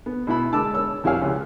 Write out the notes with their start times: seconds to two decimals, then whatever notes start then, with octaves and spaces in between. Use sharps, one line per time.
0.06 B3
0.27 B2 E4 B5
0.52 D3 G#3 A5 D6 E6
0.73 C#5 E6
1.04 F2 E4 G4 C#5 F5 G#5
1.21 C#2